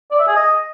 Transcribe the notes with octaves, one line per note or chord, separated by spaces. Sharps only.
D5
E5
G#4
D#5